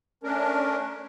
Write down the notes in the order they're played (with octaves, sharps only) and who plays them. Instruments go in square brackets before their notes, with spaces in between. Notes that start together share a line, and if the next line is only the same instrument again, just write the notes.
[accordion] A3 C#4 D4 A#4